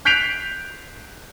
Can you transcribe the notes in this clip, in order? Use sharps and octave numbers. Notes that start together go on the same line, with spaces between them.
F#6 G6 B6 C7 D7 F7